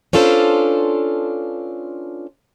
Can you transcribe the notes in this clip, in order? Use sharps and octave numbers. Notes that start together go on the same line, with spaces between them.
C#4 D4 F4 A4 B4 C5